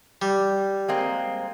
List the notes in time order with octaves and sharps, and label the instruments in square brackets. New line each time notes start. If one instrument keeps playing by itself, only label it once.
[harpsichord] G3
[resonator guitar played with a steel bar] G#3 A#3 C4